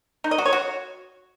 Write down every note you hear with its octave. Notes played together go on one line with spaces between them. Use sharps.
D#4
D#5
F#4
C#5
F#4